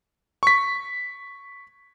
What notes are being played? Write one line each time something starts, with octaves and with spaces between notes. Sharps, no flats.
C#6 B6